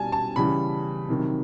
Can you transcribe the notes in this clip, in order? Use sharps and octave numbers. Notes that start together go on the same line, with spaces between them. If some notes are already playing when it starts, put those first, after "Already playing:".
Already playing: B2 G3 G#5 A5
A5
C#3 E3 G3 B5
C3 D#3 F#3